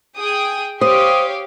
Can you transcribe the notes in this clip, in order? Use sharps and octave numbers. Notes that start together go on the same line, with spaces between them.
G#4 G5 D#6
G4 C5 C#5 F5 D#6